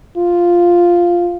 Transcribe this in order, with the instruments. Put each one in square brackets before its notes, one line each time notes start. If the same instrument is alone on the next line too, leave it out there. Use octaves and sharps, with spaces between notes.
[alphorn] F4